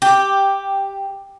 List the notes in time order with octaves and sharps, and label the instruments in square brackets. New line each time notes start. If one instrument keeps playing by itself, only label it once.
[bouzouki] G4